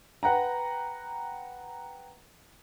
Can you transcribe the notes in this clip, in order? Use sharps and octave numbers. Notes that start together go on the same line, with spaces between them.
B4 F#5 G5 A#5